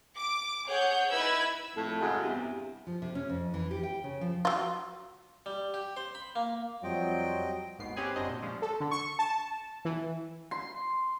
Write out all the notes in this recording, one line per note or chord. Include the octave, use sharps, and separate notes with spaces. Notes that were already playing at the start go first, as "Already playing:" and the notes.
D6
G#4 C#5 F#5 G6
D#4 E4 B4 B5 E6 G#6
F2 A2
F#2 C#3 G#3
E2 G2 C3
F3
C3
C#4
F2
E3
G4
G5
C#3
F3
F#3 F4
G3
G4
C5
B5
A#3
F2 F#3 G3 F4 C5 D#5 G5
G#1 D#2 G#2 B3 C7
C4 C#4 G4 G#4 B4 G#5
G1 F#2 C4 D4 C5 D#5
A#2
F3 G3 G#3 C#4
A4
D3
C#6
A5
E3
C6